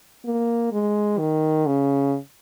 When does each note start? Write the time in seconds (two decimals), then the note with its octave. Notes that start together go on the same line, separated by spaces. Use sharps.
0.25 A#3
0.72 G#3
1.19 D#3
1.66 C#3